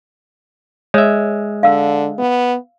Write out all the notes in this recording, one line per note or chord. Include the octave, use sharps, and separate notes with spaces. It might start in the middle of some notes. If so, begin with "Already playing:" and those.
G#3 C#5 E5
D3 F5 E6
B3